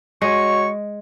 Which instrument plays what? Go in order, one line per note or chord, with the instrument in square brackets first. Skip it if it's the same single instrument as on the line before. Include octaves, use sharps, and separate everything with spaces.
[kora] G#3 [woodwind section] F#4 C#5 C#6